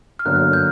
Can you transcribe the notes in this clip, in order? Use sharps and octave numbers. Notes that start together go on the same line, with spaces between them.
F6
G1 F#2 D3 F#3 A#3 F#6
G6